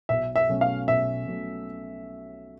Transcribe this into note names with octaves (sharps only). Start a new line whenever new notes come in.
B1 E5
E5
B2 F#3 A3 C#4
F5
B1 E5
B2 F#3 A3 C#4